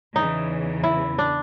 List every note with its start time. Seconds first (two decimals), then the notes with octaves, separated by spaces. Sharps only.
0.15 E2 C#3 E3 D#4
0.83 E4
1.18 D4